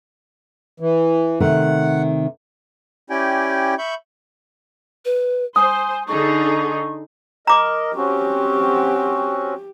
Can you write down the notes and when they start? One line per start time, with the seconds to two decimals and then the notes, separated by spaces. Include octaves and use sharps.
0.80 E3
1.40 C3 D#3 A3 F#5
3.10 C#4 E4 G4 D5 G5 G#5
3.78 E5 B5 C#6 G6
5.05 B4
5.56 C5 G#5 D#6
6.08 D3 D#4 G#4 C#6
7.47 A#4 D#5 A#5 D6
7.95 C4 C#4 F#4 G4